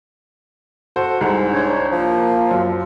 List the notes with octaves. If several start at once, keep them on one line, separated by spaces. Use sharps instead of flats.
F#4 A4 C5
C2 G#2
D4 C5 C#5
F3 A#3
F#2